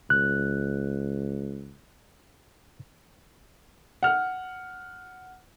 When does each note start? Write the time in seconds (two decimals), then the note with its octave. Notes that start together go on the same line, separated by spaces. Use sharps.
0.10 C#2 F#6
4.03 F#5 F6